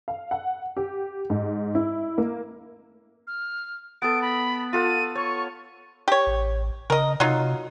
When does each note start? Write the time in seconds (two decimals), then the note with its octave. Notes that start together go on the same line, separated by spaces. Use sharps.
0.08 F5
0.31 F#5
0.77 G4
1.30 G#2
1.75 E4
2.18 A#3
3.27 F6
4.02 B3 A4 D7
4.22 B5
4.73 F4 A4 F#5 D#7
5.15 C#5 C#6
6.08 G4 C#5
6.27 A1
6.90 C#3 A#4 D#5
7.20 C3 F#3 D#4 F4